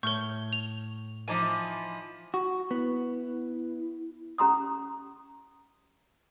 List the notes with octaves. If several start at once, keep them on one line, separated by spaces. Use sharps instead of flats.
A2 C#5 C#6 F6 G6 G7
F7
E3 F3 D#4 G#5 A#5 D6
F#4
B3 E4
C#4 G4 A#5 C6 D#6